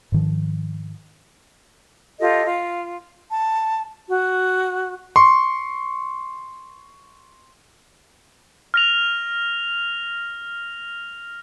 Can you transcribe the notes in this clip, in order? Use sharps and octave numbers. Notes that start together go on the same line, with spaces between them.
G#2 D#3 F3
F4 G4 A4 D#5
F4
A5
F#4
C6 C#6
F6 A#6 F7